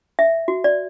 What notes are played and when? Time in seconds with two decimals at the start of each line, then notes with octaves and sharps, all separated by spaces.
0.19 E5
0.48 F#4
0.64 D5